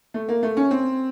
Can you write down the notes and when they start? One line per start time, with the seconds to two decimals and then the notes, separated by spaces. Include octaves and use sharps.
0.14 A3
0.28 A#3
0.43 A3
0.57 C#4
0.71 C4